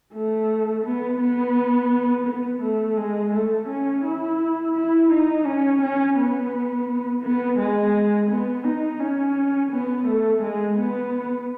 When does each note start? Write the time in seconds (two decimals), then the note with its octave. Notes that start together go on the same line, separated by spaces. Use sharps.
0.13 A3
0.85 B3
1.20 B3
2.26 B3
2.62 A3
2.97 G#3
3.33 A3
3.68 C#4
4.04 E4
4.74 E4
5.11 D#4
5.46 C#4
5.81 C#4
6.17 B3
7.23 B3
7.58 G#3
8.30 B3
8.65 D#4
9.00 C#4
9.71 B3
10.07 A3
10.42 G#3
10.77 B3